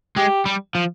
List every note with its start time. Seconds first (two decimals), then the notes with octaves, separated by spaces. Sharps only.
0.16 G#3 G4
0.46 G3
0.75 F3